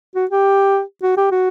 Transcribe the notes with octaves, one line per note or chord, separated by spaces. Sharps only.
F#4
G4
F#4
G4
F#4